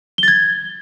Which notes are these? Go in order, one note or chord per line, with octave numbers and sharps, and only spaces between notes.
G#6 A6 G7